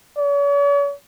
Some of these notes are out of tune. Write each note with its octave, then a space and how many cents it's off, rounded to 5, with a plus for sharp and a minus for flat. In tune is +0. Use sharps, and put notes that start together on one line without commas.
C#5 +45